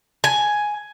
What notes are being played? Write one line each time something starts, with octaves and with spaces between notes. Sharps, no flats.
G#5